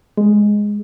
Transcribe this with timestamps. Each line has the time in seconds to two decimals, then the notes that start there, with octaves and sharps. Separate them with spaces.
0.17 G#3